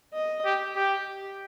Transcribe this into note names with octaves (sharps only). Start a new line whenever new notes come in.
D#5
G4
G4